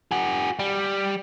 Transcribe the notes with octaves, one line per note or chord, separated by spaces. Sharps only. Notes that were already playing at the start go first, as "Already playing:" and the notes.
F#4 G#4
G3